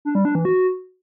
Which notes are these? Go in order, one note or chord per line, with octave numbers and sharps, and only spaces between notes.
D4
G3
D4
E3
F#4